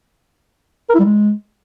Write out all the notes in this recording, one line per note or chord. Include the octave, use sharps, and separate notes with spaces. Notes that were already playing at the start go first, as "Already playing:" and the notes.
A#4
E4
G3
G#3